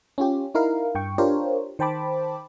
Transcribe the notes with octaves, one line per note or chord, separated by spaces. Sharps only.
C#4 F4 G4
D#4 E4 A#4 F5
G2 G5 C#6
D4 F4 G4 A#4 C5 C#5
D#3 C5 G5 A5 B5 D6